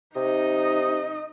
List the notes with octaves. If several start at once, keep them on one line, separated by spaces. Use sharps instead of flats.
C3 D#4 D#5